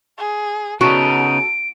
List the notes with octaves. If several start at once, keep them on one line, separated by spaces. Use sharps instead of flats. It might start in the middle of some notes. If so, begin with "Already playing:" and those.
G#4
C#3 B3 D#4 F#4 A4 D7